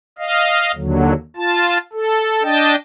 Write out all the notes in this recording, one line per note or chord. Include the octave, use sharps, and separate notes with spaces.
D#5 F5
D#2 D3 F#3
F4 A5
A4
D4 D#5 G5 A5